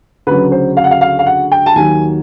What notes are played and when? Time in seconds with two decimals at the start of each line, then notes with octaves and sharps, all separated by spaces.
0.27 D2 C#3 F#3 B4
0.52 C5
0.77 F5
0.84 F#5
0.91 F5
1.01 F5
1.19 F5
1.26 F#5
1.52 G5
1.66 A5
1.76 D#2 D#3 F#3 G#5